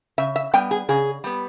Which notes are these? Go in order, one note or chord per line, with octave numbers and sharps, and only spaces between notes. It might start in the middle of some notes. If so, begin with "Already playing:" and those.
C#3 E5
E5
G3 B3 G5
G#4
C#3 G#4
G3 B3